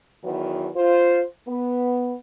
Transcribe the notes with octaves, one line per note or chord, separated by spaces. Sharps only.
E2 D#3 E3 F#3 B3 F#4
F4 C5
B3